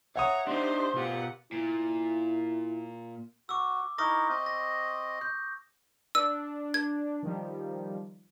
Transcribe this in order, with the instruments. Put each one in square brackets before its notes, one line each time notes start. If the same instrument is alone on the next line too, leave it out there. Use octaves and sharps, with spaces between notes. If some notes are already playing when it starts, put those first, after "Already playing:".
[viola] C#5 A#5 [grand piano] E5 F#5 D#6
[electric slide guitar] D4 D#4 [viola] G4 C5 [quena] C6
[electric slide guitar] B2 F4 [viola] G4 F#5
[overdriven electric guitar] A#2 [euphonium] E4
[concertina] F#4 [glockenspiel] D6 E6
[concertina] D#4 E4 A#4 [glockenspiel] C#6 D#6 A#6
[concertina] C4 D#5
[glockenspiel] A#6
G6
[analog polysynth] D4 [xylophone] E6
[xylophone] G#6
[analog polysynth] D#3 F3 G3